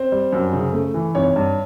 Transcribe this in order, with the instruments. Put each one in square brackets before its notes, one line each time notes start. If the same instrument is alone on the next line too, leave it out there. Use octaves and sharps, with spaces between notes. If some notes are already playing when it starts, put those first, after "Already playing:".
Already playing: [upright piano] C4 C5
G3
F#2
C#3
A3
E3
G#1 C#5
G2